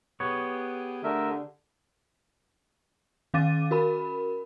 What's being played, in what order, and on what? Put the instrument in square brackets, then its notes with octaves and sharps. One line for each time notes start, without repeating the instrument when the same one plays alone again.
[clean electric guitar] B3 C#5 [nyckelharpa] G4 G#4
[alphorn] D3 [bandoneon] A3 A#4 E5
[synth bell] D#3 C#4 F5 D6 A6 D#7
F#4 A#4 B5